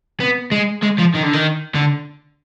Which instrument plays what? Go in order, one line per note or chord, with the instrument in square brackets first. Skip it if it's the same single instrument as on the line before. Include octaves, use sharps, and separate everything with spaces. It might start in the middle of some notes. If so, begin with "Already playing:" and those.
[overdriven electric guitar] B3
G#3
G#3
F3
D#3
D3
D#3
D3